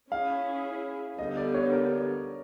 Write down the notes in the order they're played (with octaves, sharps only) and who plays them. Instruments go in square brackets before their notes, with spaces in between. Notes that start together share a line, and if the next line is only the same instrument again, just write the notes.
[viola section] C#4 E4 G#4 [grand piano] F5
[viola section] D3 G3 B3 [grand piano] D#5
[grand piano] D5
C#5
A#4